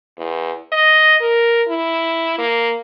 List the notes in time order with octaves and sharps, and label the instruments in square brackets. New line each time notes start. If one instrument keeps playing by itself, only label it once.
[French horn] E2
D#5
A#4
E4
A#3